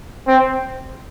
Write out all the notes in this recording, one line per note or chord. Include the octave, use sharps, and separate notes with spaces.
C4